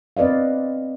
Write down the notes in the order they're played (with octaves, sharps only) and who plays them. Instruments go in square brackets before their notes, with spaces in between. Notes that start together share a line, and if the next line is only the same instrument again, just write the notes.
[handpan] C4 B4 D5 D#5 F5